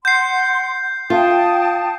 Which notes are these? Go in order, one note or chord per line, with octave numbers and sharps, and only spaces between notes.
F#5 C6 G6 C7
F4 G5 A5 D#6